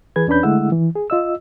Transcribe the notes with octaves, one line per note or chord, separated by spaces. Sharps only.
E3 G#4 B4 G#6
E2 C#4 D4 B4 B5 G6
D3 G#3 A3 E4 F#5 E6
E3
G#4
F4 D#5 E6